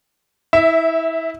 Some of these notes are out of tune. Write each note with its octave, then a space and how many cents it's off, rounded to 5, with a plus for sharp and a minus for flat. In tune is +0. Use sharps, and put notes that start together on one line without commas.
E4 -25 E5 +0